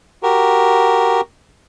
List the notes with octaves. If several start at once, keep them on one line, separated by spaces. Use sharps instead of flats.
F#4 G4 A#4